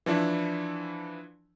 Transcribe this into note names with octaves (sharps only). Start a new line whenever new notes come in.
E3 F3 D4 E4